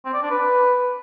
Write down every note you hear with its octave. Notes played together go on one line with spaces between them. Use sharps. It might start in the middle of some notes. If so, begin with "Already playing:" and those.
C4
D5
D4
B4